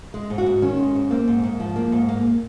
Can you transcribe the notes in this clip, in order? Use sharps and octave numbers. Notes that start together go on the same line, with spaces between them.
G#3
G#2
F#4
G#2
D#3 C#4
G#3
G#2
A#3 C4
G#2
G#2
F3
A#3
G#2
A#3